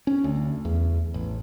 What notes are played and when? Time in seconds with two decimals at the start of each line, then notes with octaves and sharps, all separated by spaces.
0.07 C#4
0.24 D2
0.65 E2
1.14 A1